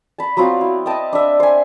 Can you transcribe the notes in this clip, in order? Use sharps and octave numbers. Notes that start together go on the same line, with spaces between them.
A5 B5
F#3 B3 C4 F4
E4
D#5 E5 G5 A5
D4 E5
C5 G#5